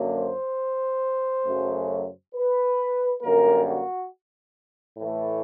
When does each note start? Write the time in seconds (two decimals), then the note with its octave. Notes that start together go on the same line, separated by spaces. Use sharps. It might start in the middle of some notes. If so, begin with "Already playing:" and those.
Already playing: F#2 D3 F#3 A#3
0.15 C5
1.46 F#2 C#3 F#3 A3
2.34 B4
3.21 F#2 D3 G3 A#3 A#4
3.65 F#4
4.96 A2 E3 A3